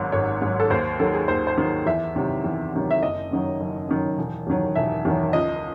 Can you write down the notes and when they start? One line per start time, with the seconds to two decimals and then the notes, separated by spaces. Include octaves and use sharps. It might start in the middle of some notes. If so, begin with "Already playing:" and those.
Already playing: G#1 G#2 F#3
0.12 G#1 C#5
0.41 G#2 F#3
0.60 A4
0.70 D#2 C5
0.99 D#3 F#3 A4
1.14 G#4
1.28 D#2 C5
1.47 C5
1.58 D#3 F#3
1.86 E2 E5
2.15 C3 D#3 F#3
2.44 E2
2.73 C3 D#3 F#3
2.91 E5
3.02 F#1 D#5
3.31 F#2 D#3 F#3
3.60 F#1
3.89 F#2 D#3 F#3
4.18 E1
4.47 E2 D#3 F#3
4.75 E1 E5
5.05 E2 D#3 F#3
5.33 C#2 D#5